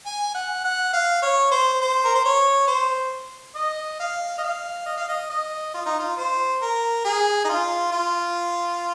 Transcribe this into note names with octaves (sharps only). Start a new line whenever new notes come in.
G#5
F#5
F#5
F5
C#5
C5
C5
A#4
C5
C#5
C5
D#5
F5
D#5
F5
D#5
F5
D#5
D#5
F4
D#4
F4
C5
A#4
G#4
D#4
F4
F4